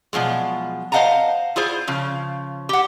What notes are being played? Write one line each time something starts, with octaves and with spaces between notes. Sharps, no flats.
B2 F3 F#3 G#3
C5 D#5 F5 F#5 A5 A#5
E4 F4 G#4 C5
C#3 F3
G4 F#5